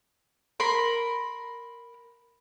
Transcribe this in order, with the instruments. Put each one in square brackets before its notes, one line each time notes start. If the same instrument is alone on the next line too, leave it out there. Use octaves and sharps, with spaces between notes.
[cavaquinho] A#4 B5 C6